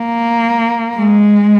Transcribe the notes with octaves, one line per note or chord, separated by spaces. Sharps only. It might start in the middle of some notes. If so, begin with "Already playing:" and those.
Already playing: A#3
G#3